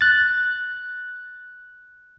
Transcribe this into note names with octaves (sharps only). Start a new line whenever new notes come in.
F#6 A6